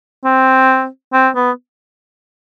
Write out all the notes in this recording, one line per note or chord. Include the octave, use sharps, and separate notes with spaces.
C4
C4
B3